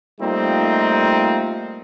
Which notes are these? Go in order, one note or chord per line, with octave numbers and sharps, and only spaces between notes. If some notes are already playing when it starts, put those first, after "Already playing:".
G3 A3 A#3 C4 D#4 F4